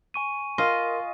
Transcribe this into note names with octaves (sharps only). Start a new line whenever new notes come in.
G#5 C#6 D#7
F4 A#4 D#5 C6